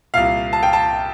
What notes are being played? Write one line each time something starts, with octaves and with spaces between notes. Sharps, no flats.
C2 A#2 F5
A5
G5
A5